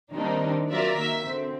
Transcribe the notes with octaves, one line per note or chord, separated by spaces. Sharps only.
D#3 G3 A#3 C4 D4 D#4
F#3 F4 A#4 D5 E5
D#3 A#3 F#4 E5 B6
D3 C4